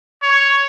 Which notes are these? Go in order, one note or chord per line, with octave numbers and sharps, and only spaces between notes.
C#5